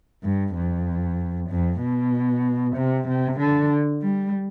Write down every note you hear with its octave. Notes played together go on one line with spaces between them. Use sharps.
G2
F2
F2
B2
C3
C3
D3
G3